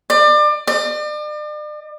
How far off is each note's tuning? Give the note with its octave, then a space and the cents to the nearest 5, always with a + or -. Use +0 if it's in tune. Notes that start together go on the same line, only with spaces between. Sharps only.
D5 +30
D5 +40